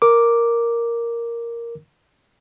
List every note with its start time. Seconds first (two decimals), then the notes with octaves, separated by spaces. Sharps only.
0.02 A#4 D6